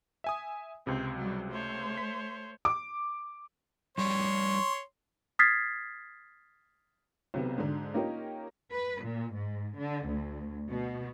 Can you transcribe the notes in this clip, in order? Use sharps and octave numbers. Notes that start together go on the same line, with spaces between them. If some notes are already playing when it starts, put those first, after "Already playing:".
E5 G#5 D#6
C#2 C3 C4
F#3 G3
A3 C5 C#5
B6
D6
F2 G3 C#5 D5 C6
D#6 F6 G#6 A6 B6 C7
B1 C3 B3
G#2 D3
A#3 C#4 D#4 F4 G4 A#4
B4
A#2
G#2
D3
D2
B2